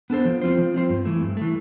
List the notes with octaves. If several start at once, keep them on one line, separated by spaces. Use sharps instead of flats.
B3 D4 A4 C5
F3
C4 F4 C5
F3
C4 F4 C5
G2
E3 A3
G2
E3 A3